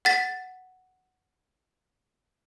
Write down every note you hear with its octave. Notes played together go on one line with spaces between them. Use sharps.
F#5 A6 B6